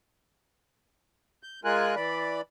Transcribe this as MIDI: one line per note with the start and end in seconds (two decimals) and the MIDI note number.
1.43 1.60 91
1.65 1.95 56
1.65 1.95 65
1.65 1.95 70
1.65 1.95 80
1.65 1.95 90
1.96 2.41 52
1.96 2.41 74
1.96 2.41 83